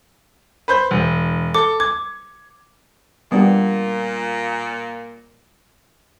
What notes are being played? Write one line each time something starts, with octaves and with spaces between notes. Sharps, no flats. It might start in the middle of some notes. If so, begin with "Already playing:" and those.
B4 C5 G6
E1
A4 D6
D6 G#6
A#2 G3 B3 D4 G4